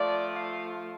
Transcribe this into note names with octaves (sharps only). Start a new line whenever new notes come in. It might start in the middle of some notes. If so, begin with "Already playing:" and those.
Already playing: F3 A3 F4 D5
F5